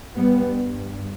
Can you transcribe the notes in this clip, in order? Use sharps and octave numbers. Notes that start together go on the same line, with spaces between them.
G2 G3 B3